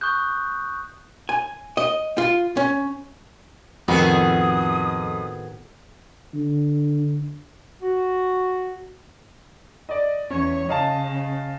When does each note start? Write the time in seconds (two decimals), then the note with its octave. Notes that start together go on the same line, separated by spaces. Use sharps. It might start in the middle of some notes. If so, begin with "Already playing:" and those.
0.01 C#6 D#6 F#6 G6
1.29 G#5
1.77 D#5
2.18 F4
2.57 C#4
3.88 F2 A2 D#3 B3 F#4 G#4 A4 D#6
6.34 D3
7.81 F#4
9.89 D5 D#5
10.30 E2 C#4 C#5
10.69 C#3 D#5 F5 A5